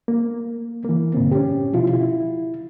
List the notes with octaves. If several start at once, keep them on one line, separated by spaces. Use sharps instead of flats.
A#3
E3 A#3
G2 A#2 D3 C4
C#4 G4
B2 F3 E4 F4
E4